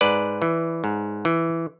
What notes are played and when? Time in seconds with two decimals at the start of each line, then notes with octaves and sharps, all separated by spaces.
0.01 G#2 B4 D5
0.42 E3
0.84 G#2
1.25 E3